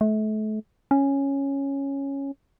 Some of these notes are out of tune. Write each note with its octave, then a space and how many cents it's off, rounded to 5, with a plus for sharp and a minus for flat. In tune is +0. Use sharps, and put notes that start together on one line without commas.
A3 -35
C#4 -5